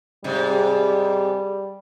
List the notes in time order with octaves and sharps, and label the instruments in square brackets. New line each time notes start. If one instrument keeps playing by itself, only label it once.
[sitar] G#2 C3 [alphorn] G3